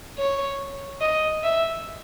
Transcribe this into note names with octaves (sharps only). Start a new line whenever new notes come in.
C#5
D#5
E5